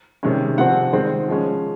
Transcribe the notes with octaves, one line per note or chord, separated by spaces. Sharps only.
C3 D#3 G#3 C#4
C3 F3 C4 F#5
D#3 G#3 C4
F3 G#3 C#4